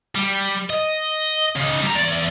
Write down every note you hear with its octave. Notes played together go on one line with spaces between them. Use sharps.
G3
D#5
C#3 D#4
G3 A#5
E2 D5